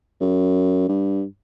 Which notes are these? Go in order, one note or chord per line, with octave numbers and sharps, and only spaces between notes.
F#2
G2